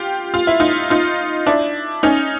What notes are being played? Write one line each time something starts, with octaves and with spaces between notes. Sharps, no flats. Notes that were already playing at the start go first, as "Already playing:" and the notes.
Already playing: F4 G4
F4
E4
D#4 F4
D#4 F4
D4 E4
C#4 D#4